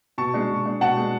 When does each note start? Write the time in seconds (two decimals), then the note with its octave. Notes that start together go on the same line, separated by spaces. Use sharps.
0.18 B2 A5 C#6
0.34 G#3 D4
0.50 B2
0.66 G#3 D4
0.81 B2 F#5 A5
0.97 G#3 D4